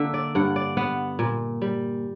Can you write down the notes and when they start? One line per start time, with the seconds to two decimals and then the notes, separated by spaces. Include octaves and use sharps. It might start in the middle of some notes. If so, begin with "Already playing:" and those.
Already playing: D3 A#3 E5
0.14 D5
0.35 G2 F#5
0.56 D5
0.77 B3 F#5
1.19 A#2
1.62 G3